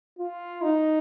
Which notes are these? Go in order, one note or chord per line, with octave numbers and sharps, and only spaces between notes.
F4
D#4